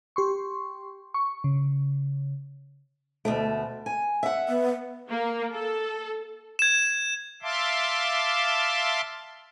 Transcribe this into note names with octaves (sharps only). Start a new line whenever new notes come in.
G4 C6 C#6
C#6
C#3
D2 B2 A3
G#5
E5 F#5
B3
A#3
A4
G#6 E7
E5 F5 A5 C6 D6